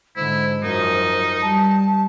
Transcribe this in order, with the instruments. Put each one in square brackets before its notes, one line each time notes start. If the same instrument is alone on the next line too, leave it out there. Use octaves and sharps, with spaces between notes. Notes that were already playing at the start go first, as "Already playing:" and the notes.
[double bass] G#2 D3 [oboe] E4 [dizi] C5
[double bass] F#2 F3 [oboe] D#4 [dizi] A#4
[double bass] G3 [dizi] A5